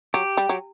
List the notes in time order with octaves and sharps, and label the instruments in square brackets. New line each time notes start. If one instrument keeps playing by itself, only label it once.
[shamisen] F#3 [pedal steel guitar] G4
[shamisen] G3
F#3